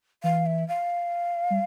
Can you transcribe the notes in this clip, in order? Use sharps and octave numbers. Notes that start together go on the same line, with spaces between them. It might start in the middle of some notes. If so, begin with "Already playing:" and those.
E3 F5
E5
F5
G3